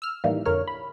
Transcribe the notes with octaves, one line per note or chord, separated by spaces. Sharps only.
E6 F6
A2 D#3 E3 G3 A#3
F2 D3 A#4 C#5 F6
B5